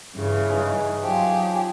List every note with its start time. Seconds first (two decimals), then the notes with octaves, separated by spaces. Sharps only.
0.14 G2 C#3 E3
0.50 C#4 D#4 G#4
1.03 F3 F#3 G4 G#4